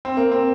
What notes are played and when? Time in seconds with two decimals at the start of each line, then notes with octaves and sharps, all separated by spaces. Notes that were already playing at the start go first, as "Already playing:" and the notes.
0.05 C4
0.17 A#3
0.32 C4